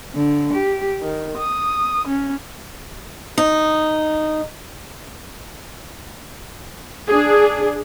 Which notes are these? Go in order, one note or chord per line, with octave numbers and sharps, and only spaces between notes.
D3
G4
D#3
D#6
C#4
D#4
D4 G#4